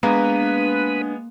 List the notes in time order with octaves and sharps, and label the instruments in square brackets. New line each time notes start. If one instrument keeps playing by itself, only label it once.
[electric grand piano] G#3 B3 [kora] A#3 [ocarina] D4 [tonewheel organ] B4